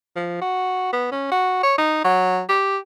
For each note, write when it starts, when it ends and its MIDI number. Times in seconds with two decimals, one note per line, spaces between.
0.16 0.41 53
0.41 0.91 66
0.93 1.07 59
1.11 1.27 61
1.31 1.63 66
1.63 1.77 73
1.78 2.03 63
2.04 2.41 54
2.49 2.77 67